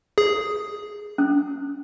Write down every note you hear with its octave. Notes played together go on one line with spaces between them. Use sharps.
G#4
C#4